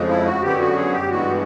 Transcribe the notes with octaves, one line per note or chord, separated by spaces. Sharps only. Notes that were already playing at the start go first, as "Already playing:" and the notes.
Already playing: F2 C#3 F3 G#3
E4
F#4
F#2 D3 F#3 B3 G4
F#4
G#4
G4
G2 E3 G#3 B3 F#4